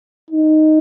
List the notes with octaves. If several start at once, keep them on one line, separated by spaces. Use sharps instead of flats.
D#4